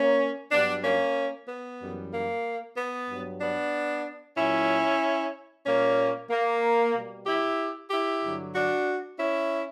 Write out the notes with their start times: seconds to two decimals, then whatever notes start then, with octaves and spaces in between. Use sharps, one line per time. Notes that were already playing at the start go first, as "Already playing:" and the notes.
Already playing: A#3 C#4
0.51 G2 F#3 B3 D4
0.84 A#3 C#4
1.48 B3
1.80 F#2 E3 G3
2.13 A#3
2.77 B3
3.09 G2 F#3
3.41 B3 D4
4.37 A#2 F#3 C#4 E4
5.66 A#2 G3 A#3 C#4
6.30 A#3
6.94 B2 G3
7.26 E4 G4
7.90 E4 G4
8.23 G2 D3 F#3
8.55 D4 F#4
9.19 C#4 E4